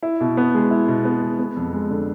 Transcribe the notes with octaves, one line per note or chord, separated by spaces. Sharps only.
E4
B2
B3
G#3
E4
B2
B3
G#3
B3
F2
G#3
D3